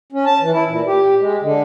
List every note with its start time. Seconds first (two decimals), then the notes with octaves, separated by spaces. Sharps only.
0.12 C#4
0.26 A5
0.40 E3
0.52 E4
0.69 A#2
0.87 G4
1.21 G#3
1.42 D3